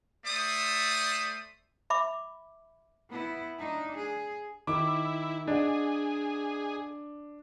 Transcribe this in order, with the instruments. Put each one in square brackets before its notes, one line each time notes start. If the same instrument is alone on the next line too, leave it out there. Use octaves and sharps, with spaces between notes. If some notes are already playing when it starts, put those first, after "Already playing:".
[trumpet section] A3 C5 D5 E5 D#6
[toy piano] E5 B5 D6
[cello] B3 E4
D4 D#4
G#4
[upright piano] D#3 [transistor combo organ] E4 [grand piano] D6
[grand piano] D4 [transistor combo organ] G#4 [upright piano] D#5 F#5